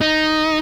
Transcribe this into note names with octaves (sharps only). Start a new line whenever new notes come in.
D#4